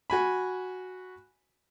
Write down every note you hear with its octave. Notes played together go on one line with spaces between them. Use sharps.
F#4 G#5 B5